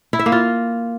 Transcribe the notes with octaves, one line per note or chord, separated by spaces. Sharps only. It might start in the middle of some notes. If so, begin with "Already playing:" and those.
E4
E5
A#3
F4